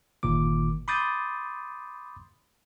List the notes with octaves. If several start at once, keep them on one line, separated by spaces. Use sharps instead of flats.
G1 A#2 D#3 D6
B5 C6 D6 D#6 G6 A6